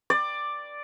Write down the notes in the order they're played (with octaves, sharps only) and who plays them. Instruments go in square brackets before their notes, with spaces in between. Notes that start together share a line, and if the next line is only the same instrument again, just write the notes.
[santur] D5